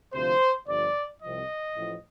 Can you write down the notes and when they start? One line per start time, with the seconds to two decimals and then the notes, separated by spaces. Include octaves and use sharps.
0.14 D2 C3 F3 C5
0.67 G1 G2 F3 D5
1.21 C2 C3 F3 D#5
1.76 A1 A2 F3